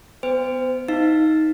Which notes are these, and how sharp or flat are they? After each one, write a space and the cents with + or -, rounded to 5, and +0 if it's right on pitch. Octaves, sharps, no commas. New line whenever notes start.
B3 +25 C5 -25 G5 +30
D#4 +15 F5 +0